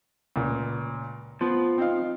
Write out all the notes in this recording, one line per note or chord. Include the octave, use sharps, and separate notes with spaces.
C#2 A#2
F3 B3
C4 D#4 F5